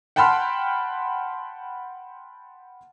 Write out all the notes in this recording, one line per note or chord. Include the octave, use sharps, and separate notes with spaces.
F#5 G5 A5 B5 C6 F6